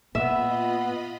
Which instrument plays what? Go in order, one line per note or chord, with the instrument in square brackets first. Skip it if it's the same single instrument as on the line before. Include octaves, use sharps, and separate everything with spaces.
[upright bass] A#2 [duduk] B3 [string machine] F4 D#5 B5 [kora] E5